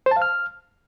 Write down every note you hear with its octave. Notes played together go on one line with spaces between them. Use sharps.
C5
A5
F5
F6